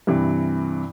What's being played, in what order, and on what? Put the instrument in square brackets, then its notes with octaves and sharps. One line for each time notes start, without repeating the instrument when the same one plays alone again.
[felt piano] G2 C3 E3